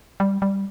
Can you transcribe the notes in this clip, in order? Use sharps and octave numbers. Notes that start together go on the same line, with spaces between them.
G3
G3